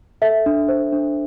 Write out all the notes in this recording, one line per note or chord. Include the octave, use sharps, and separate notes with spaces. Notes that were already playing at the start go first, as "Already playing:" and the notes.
A4 E5
D4
C5
D4